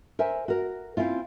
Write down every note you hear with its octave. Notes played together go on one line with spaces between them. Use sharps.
A#4 C5 E5 G#5
F#4 A#4
C4 C#4 E4 F4